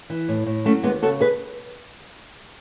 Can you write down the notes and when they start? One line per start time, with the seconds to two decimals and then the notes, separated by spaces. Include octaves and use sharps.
0.10 E3
0.28 A2
0.46 A2
0.65 F#3 A3 C#4
0.83 D#2 G#3 B3
1.02 C#3 F#4 A4
1.21 G#4 B4